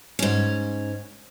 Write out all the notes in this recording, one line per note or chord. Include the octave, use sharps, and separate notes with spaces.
G#2 C#4